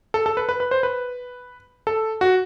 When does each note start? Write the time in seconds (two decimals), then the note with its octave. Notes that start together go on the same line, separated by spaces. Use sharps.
0.14 A4
0.26 A4
0.37 B4
0.49 B4
0.60 B4
0.71 C5
0.83 B4
1.87 A4
2.21 F#4